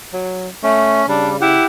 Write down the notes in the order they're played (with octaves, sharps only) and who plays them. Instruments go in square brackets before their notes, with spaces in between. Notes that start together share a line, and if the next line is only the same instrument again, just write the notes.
[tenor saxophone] F#3
[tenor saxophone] A3 [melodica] C#4
[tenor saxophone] C#3 [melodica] G3 [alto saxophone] D4
[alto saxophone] E4 [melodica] G4 F#5